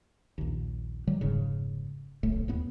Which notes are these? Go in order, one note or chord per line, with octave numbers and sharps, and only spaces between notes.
A#1 D#2
D#3 F#3 G3
F1 G#2 C#3
D1 B1 A2 A3
D#2 A2 B3